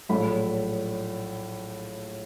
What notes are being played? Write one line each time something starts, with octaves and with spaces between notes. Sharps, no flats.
A#1 A2 F#3 B5